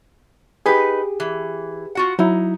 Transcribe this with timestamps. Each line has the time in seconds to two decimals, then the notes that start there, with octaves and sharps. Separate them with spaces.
0.66 D#4 G4 G#4 B4
1.20 E3
1.95 F4 F#4 F#5
2.19 F#3 D#4 E4